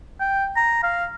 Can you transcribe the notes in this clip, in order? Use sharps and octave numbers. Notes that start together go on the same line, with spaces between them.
G5
A#5
F5